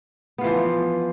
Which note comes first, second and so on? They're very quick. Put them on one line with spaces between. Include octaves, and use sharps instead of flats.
B3 F4 E3 F3